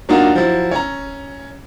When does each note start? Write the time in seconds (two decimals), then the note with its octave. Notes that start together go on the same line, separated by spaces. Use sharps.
0.09 F#3 A#3 D4 D#4 F4 F#4
0.35 F3 F#3 E4
0.71 C#4 A#5